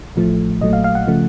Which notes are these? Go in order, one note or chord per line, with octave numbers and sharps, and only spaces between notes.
A1 A2 F3 A3
A#1 A#2 F#3 A3 D#5
F5
F5
F#5
C#3 F3 A3